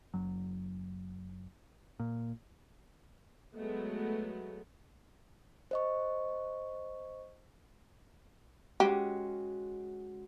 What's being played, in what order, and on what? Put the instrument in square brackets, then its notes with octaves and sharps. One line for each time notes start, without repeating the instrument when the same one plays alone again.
[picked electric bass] F#1 F#3
A#2
[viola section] F#3 G#3 A3 B3
[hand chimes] C5 D#5 C#6
[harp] G#3 C#4 F#4 [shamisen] G4